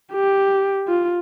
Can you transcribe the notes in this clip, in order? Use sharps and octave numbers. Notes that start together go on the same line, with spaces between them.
G4
F4